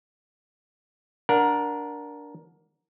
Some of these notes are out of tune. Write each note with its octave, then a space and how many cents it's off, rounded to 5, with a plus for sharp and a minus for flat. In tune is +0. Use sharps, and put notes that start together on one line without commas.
D4 -10 A#4 +10 F#5 -20